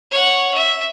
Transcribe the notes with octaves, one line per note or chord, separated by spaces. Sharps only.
C#5 F#5
E5